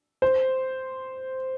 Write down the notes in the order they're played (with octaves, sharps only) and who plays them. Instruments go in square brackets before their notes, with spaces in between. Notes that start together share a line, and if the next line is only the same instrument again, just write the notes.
[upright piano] C5